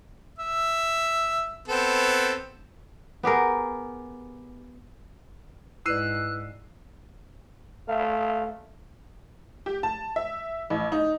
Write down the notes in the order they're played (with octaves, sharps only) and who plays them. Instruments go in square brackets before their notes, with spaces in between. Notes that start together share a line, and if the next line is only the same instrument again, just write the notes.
[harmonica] E5
B3 C4 A4
[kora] B3 G4 G#4 A#4
[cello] G#2 [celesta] E4 B4 D5 [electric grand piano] E6 C7 D#7 [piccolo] F#6
[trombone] A3 [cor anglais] F5
[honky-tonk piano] G4
A5
E5
A1
D#4